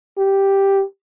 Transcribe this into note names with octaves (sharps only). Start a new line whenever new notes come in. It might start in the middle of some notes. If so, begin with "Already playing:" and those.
G4